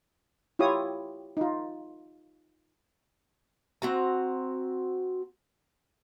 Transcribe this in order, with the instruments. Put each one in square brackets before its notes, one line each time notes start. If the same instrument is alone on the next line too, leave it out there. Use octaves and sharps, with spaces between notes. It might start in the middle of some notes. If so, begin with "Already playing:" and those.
[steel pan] E4 F4 G4 C#5 D#6
D#4 F4
[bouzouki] C4 F#4 A#5